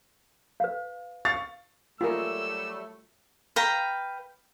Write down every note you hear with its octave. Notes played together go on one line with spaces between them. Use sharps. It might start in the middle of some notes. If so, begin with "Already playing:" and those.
B4 F5
F5 C#6 A6
F#3 G3 A3 F4 G#4 A#4 E6
B4 F5 G5 A#5